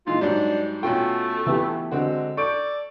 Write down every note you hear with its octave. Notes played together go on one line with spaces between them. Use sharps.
A#2 E3 G#3 F4
G#2 F#3 G3 D4
B2 A3 C#4 F4 G5
E3 B3 G4
D3 G#3 C4 F#4
A4 D5 C#6 G6 D7